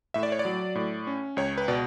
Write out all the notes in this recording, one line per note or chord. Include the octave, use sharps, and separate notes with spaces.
A2 E5
D5
C#5
D5
F#3
A2
C#4
C#2 C#5
B4
B2 D5